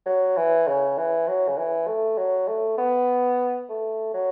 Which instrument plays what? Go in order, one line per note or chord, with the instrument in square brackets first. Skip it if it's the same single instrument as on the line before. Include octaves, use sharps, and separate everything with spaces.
[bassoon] F#3
E3
C#3
E3
F#3
C#3
E3
A3
F#3
A3
B3
A3
F#3